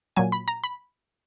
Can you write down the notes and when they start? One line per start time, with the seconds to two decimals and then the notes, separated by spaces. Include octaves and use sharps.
0.16 A#2 F#3 G#5
0.32 B5
0.48 A#5
0.64 B5